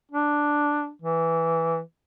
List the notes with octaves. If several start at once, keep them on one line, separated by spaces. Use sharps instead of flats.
D4
E3